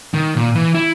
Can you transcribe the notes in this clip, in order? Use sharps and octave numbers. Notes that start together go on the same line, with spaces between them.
D#3
A#2
E3
E4